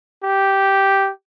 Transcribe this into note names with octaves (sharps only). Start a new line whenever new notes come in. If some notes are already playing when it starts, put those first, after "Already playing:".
G4